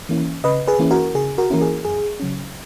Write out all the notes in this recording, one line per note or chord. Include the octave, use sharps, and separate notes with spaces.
E3 A#3 C#4 E4
C#3 B4 D#5
G#4 B4
E3 A#3 C#4 E4
F#4 A#4
C#3 G#4
F#4 A#4
E3 A#3 C#4 E4 A#4
G#4
F#2 G#4
C#3 F#3 C#4